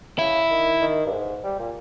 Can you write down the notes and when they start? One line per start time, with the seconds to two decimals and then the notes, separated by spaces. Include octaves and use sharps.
0.19 C#3 E4
0.51 D#3
0.81 D#3
1.06 G2
1.13 G#2
1.44 G3
1.59 A#2